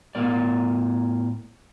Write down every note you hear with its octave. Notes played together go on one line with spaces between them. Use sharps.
A2 B3 A#4 D5